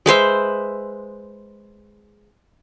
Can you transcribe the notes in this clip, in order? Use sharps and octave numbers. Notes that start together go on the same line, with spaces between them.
G#3 B4 C5 E5